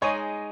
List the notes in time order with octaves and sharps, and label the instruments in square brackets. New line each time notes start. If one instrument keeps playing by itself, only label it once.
[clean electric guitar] G#3 D#4 G#4 [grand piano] C#5